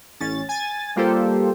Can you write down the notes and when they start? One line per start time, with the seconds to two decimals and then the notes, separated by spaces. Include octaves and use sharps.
0.20 A1 C#4 A6
0.49 G#5 A6
0.96 G3 A#3 F4 G4 A4 C5